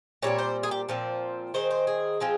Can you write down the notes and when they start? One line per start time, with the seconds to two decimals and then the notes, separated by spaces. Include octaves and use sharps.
0.22 A#2 G3 C4 C#5
0.39 C5
0.63 G#4
0.71 G4
0.89 A#2 F3 C4
1.54 D#3 G#3 C4 C5
1.71 C5
1.87 G#4
2.20 F3 G#3 C4